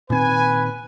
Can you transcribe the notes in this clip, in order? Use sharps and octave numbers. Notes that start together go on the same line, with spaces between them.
A#2 D#3 C4 B4 G#5